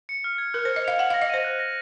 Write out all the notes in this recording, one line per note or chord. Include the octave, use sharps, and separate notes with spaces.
C#7
F6
G#6
A#4 F#6
C5 C#7
D#5
F5 F7
F#5 F#7
F5 A#6
D#5
C5 D#7
F#6
A#6